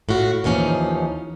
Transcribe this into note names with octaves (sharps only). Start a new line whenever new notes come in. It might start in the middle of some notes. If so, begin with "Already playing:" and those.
A2 F4 F#4
D#2 E3 F3 C#4 D#4